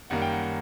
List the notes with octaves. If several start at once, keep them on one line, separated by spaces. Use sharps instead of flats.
F#2 D#3 G3 A#3 F#5
G5
F#5